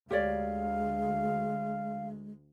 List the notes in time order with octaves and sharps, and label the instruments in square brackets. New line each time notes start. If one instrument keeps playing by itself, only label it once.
[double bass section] D2 [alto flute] G#3 [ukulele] G4 C#5 D5 [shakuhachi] F5